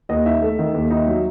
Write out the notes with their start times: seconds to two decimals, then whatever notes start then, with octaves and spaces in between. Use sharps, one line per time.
0.09 D#2 D#5
0.26 D#4 E5
0.42 A3
0.59 D#3
0.74 D#2
0.91 D#4
1.07 F#3